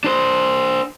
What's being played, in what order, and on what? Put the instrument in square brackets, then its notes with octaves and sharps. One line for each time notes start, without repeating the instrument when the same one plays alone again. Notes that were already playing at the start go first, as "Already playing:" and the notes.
[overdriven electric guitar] D4 C5